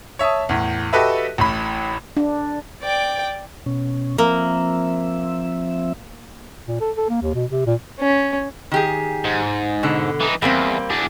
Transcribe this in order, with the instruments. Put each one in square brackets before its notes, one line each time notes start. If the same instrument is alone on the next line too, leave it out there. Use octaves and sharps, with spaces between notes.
[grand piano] C#5 E5 A5 D#6
E2 A2
F#4 G4 A4 B4 D#5 E5
A1 A2 B5
[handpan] D4
[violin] D5 G5
[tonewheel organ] B2 C#4
[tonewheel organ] F3 C4 E5 [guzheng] A#3
[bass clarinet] A#2
A4
A4
A#3
D#2
B2
C3
A#2
[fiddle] C#4
[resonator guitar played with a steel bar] D#3 G4 G#4
[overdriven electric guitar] G#2
[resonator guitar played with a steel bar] B2 D3 A4
[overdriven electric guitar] E3 D#4
[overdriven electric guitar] E2 [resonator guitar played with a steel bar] G3 A#3 C4
[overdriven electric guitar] E2 D4